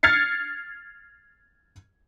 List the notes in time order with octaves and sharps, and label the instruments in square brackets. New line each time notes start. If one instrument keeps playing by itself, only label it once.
[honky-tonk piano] F6 G#6 A6 C7 C#7